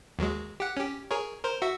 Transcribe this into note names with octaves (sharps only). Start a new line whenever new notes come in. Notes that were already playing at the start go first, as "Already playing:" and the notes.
D#2 F#3 G#3
G4 F#5
C#4 G4
G#4 A#4 C#5
A#4 C5
F#4 E5